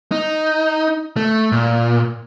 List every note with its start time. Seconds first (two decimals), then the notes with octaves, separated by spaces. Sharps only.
0.12 D#4
1.17 A3
1.52 A#2